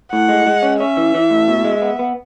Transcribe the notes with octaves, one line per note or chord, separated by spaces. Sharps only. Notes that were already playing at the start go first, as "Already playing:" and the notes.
A2 F#5
G#3
G#3
C#4
C#4 E5
E3
E3
A2
B2
G#3
B3
B3